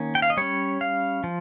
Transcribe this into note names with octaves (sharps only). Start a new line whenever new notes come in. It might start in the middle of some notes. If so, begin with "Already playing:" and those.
Already playing: D#3 A#3 C#4
G5
F5
D#5
G3 C#4 C#5
F5
F3